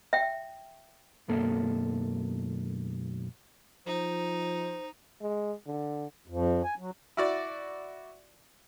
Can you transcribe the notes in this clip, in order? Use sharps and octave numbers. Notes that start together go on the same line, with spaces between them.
E5 G5
B1 F#2 A#3 A4
F3 D#4 C5
G#3
D3
F2
G#5
F#3
E4 F#4 D5